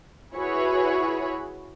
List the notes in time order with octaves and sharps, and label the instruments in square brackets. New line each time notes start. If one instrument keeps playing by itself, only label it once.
[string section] E4 F#4 G#4 B4 C#5 B5